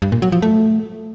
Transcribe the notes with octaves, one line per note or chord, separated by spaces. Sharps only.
G2
A#2
F#3
F3
A3